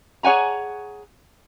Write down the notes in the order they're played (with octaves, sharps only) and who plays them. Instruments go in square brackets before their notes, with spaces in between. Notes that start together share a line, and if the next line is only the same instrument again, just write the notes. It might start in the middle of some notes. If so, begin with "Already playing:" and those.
[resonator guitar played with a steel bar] G#4 C#5 F#5 G#5 A#5